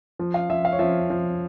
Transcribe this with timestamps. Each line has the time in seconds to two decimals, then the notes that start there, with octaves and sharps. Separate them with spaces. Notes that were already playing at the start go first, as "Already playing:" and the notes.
0.19 F3
0.34 F5
0.50 F3 E5
0.65 F5
0.72 C#5
0.79 F3 E5
1.10 F3